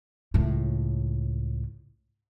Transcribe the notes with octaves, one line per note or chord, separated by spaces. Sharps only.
C#2 A2